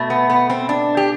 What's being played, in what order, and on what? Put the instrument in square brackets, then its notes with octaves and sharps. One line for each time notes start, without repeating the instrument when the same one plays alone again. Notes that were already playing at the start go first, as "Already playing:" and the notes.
Already playing: [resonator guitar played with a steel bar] B2 A3
B3
B3
C4
D4
G4